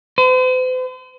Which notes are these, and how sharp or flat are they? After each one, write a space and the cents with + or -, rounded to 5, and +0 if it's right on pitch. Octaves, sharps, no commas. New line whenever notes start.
C5 -45